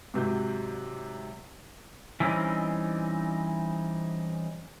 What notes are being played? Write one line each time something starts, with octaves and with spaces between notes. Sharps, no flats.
G#2 C3 F#3 G6
E3 G3 C4 C#4 D#4